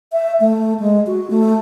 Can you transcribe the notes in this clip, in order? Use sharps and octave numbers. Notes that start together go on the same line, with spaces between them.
E5
A3
G#3
F#4
A3